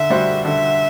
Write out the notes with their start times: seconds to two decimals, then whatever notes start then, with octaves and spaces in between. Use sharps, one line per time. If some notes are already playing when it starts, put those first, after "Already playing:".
Already playing: D3 E5
0.10 G3 D4 F#4 C5
0.44 D3 E5